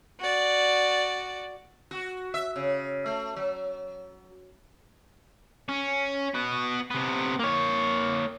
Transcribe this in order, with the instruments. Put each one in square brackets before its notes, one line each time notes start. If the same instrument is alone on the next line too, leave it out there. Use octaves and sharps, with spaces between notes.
[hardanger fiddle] F#4 D5
[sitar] F#4
E5
C#3
A3
F#3
[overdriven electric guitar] C#4
B3 F#4
C3 B3
A#3 C#5